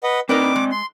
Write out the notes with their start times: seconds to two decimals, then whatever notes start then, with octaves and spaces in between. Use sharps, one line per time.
0.03 B4 D#5 F#5
0.29 C4 D#4 A#4 B4 D5 D#5 D6
0.56 G#3
0.72 C6